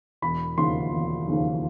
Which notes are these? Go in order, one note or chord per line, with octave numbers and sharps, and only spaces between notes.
E1 B5
D#2 C#3 F3 C6
E1
D#2 C#3 F3